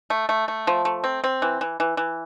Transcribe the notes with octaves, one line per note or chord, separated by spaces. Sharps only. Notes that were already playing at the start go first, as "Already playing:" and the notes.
A3
A3
A3
F3
A3
C4
C4
E3
E3
E3
E3